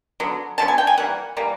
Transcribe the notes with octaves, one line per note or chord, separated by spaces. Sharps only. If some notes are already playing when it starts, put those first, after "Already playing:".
D3 F#3 B3
D3 F#3 B3 A5
G#5
G5
G#5
E3 G3 A#3 F#5
E3 G3 A#3